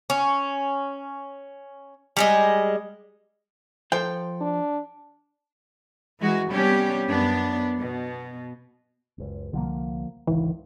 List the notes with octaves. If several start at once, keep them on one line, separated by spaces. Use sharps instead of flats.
C#4
G3 G#3 D#5
F3 A4 C5 G5
D4
E3 G#3 F#4
C3 G3 B3 C#4 D4 G4
F#2 B3 D4
B2
F#1 C#2
C2 D3 F3 A#3
G#1 C#2 D#3 E3